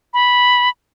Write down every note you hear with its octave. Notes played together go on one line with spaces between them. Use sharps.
B5